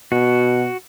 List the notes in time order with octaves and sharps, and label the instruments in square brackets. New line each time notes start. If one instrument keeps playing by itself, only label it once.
[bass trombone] B2 [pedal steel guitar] F#4